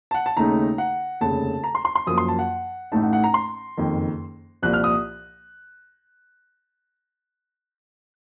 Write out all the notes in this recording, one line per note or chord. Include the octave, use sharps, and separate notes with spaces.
A5
F#5
A5
D#2 C#3 A3 D#4 A#5
F#5
F1 D#2 C#3 A5
A#5
C6
C6
C6
F#2 F3 A#3 D#6
C6
A5
F#5
A1 A2 A3 D#4 A5
F#5
F#5
A#5
C6
F#1 F2 D#3
C2 A#2 F3 F#6
F6
D#6